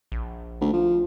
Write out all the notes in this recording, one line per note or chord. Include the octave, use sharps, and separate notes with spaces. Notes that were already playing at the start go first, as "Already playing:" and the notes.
A#1
D2
F3